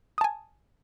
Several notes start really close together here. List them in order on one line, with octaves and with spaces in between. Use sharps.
D#6 A5 G#5